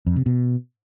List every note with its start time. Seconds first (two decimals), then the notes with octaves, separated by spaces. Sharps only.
0.07 F2
0.16 C3
0.26 B2